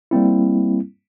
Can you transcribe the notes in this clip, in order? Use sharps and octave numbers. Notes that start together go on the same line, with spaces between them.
G3 A#3 C4 E4